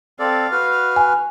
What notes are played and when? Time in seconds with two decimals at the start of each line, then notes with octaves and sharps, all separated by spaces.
0.19 C4 A4 D5 F5
0.51 F#4 B4 F6
0.96 G#5